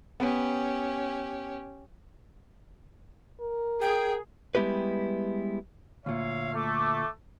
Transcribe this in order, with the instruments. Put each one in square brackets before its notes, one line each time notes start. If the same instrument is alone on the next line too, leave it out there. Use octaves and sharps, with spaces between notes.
[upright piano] B3 [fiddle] C#4 G4
[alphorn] A#4
[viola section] G#4 [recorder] G5
[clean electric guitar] G3 G#3 B3 E4 G4 B4
[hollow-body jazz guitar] D2 A#2 [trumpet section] C#5 E5 F5
[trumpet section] A3 [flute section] D6